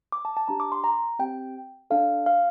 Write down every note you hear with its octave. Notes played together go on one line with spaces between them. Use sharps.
D6
A5
A5
D4 G4 A#5
D6
C6
A#5
C4 G4 G5
D4 A4 F5
F5